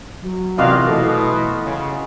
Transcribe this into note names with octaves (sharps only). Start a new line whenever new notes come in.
F#3
C3 E3 A#3 F4 F#4 D5 D#5 F5
B2 E3 A3
C#3